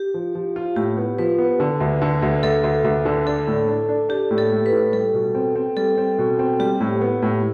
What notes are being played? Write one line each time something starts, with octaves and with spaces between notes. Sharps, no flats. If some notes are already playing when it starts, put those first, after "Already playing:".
Already playing: G4
F3
F3
F4
A2 G4
B3
F3 B4
B3
D3
D2
D3
D2
D2 A4
D2
D2
D3
D4 A4
A2
D4
D4
D4 G4
A2
A4
A2
B4
A2
G3 A4
B2
C4
C4
G3 A4
C4
B2
C4
G3 G4
A2
B3
A2